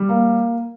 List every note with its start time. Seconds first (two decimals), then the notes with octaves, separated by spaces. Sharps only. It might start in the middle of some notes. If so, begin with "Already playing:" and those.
Already playing: G3
0.09 A#3